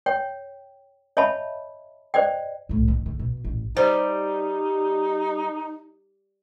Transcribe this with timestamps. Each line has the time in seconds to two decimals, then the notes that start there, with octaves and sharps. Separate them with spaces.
0.06 C#5 G5
1.17 C#5 D#5 E5 A5 B5
2.14 C5 D5 D#5 G5
2.69 C2 A2
2.88 D#3
3.06 D3
3.19 B2
3.44 A1
3.77 G3 D#4 C5